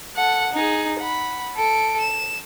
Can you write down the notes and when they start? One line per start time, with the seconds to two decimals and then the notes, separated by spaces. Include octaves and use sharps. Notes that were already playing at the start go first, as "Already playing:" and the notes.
0.16 A4 F#5
0.52 D#4 G#4
0.99 F#5 B5
1.56 A4 D7
2.01 E7